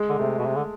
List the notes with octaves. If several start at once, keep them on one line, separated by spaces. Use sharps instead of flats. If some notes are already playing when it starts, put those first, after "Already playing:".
Already playing: G#3
D3
C3 A3
B2
C3
D3